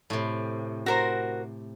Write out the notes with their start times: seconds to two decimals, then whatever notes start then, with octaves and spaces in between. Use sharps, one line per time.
0.10 A2 C3
0.86 F#4 A#4 C5